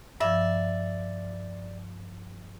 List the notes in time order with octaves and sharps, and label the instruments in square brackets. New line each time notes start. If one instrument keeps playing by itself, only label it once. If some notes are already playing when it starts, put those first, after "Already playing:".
[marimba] G2 F3 [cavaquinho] D5 E5